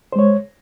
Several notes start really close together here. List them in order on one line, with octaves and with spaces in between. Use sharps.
C5 G#3 C#5